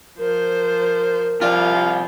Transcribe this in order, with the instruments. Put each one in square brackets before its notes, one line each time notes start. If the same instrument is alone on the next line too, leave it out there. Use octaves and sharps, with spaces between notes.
[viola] F3 C5 [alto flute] A#4
[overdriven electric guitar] C3 D5 [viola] F3 [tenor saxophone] F4